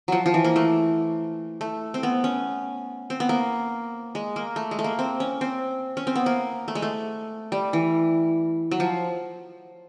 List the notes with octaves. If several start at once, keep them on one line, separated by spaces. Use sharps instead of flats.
F3 F#3
F3
E3
A#3
A3
A3
C4
B3
C#4
C4
B3
A#3
G#3
A#3
A3
G#3
A3
A#3
C4
C#4
C4
C#4
C4
B3
A#3
A3
G#3
A3
G3
E3
F#3
F3